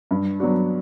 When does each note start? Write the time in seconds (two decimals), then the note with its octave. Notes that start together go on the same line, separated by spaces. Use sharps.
0.11 G2
0.40 F#3 B3 D4 F#4